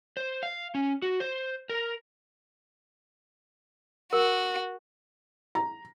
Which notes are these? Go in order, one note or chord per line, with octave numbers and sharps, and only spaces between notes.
C5
F5
C#4
F#4
C5
A#4
F#4 A#4
A#5